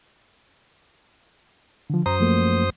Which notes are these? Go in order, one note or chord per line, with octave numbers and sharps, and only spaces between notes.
D3 F3
F#2 C5 A#5 D#6
F3 A3 A#3